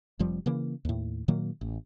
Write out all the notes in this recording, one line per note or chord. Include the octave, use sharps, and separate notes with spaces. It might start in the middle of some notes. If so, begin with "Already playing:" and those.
F1 F2 F3 G3
C#3 E3 A#3
D#2 A2
A#2 D#3 F#3 A#3
A1